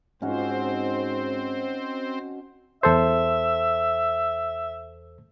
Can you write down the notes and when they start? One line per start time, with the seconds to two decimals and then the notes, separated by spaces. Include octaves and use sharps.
0.22 G#2 C4 C#4 D#4 F#4 C5
2.83 E2 A4 C5 E5